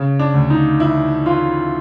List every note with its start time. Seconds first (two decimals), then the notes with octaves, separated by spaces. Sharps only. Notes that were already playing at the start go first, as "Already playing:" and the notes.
Already playing: C#3
0.19 D4
0.34 D2
0.50 D#4
0.80 E3 E4
1.26 E3 F4